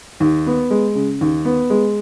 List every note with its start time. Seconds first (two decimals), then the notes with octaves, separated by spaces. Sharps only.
0.20 D#2
0.46 B3
0.70 G#3
0.95 C#3
1.21 D#2
1.45 B3
1.70 G#3